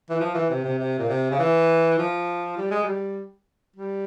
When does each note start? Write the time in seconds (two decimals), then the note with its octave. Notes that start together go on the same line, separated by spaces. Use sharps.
0.10 E3
0.20 F3
0.34 E3
0.50 C3
0.64 C3
0.79 C3
0.98 A#2
1.09 C3
1.31 C#3
1.39 E3
1.98 F3
2.57 G3
2.71 G#3
2.84 G3
3.76 G3